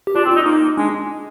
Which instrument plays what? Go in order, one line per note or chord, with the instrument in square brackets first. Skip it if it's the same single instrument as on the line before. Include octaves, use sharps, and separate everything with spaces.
[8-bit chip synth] G4
[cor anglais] D4 [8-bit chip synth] F4
[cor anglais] C4
[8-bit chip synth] F4
[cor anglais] D#4
[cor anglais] A#3 [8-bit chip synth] D#4
[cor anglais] G#3 [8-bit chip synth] D4